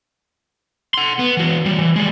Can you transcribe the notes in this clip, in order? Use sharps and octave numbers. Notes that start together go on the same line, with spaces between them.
F#5 C6
B3
E3 F#4
E3 G3
E3
G3 G#3